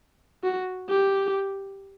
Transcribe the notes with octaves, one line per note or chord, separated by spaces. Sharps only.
F#4
G4